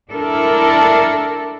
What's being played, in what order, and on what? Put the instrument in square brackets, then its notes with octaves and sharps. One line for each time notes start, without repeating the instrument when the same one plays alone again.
[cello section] D4 E4 A4 A#4